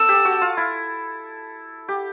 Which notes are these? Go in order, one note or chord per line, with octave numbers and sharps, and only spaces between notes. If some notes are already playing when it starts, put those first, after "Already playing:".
Already playing: A4 E6
G4
F#4
F4
E4
G4